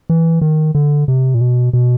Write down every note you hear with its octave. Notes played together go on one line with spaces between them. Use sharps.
E3
D#3
D3
C3
A#2
B2
B2